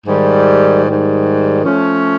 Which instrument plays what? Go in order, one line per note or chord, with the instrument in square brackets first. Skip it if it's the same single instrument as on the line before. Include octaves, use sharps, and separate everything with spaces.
[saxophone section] G#2 D#3 G3
G#2 D#3 G3
F3 A3 C#4